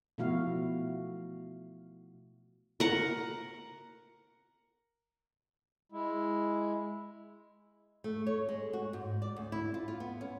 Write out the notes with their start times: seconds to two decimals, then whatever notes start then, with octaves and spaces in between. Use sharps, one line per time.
0.18 B2 F3 A3 E4 F#4 F5
2.80 A#4 F#5
5.92 G#3 E4
8.04 A3
8.27 C#5
8.49 G#3
8.73 F#4
8.93 G#2
9.22 D5
9.36 D2
9.52 E4
9.74 F4
9.88 F4
10.00 B3
10.21 C#4